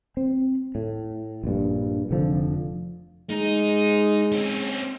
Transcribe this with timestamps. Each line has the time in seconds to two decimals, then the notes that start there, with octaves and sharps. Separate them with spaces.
0.17 C4
0.75 A2
1.44 A#1 G2
2.11 F1 D3 F3
3.30 G#3 D#4
4.32 C4 C#4